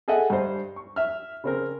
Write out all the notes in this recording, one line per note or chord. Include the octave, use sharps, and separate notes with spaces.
G#4 A4 D#5 E5 F#5
G2 C5
C#6
E5 F6
C#3 C4 A#4